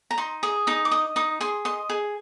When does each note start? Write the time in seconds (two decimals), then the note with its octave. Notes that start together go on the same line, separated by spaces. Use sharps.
0.11 A#5
0.18 D#4 C6
0.43 G#4 D#6
0.67 D#4 D#6
0.85 D6
0.91 D#5 D#6
1.16 D#4 D#6
1.41 G#4 C6
1.65 D#5 C6
1.90 G#4